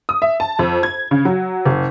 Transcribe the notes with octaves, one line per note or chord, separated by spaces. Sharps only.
D#6
E5
A5
F2
G#6
C#3
F#3
F#1